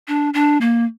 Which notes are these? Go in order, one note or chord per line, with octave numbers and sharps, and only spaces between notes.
D4
D4
A#3